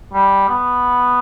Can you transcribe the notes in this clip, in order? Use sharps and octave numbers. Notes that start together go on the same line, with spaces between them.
G3
B3